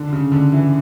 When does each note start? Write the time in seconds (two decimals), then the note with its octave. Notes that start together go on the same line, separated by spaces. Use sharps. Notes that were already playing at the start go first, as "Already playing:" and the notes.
Already playing: D3
0.13 C#3
0.32 D3
0.52 E3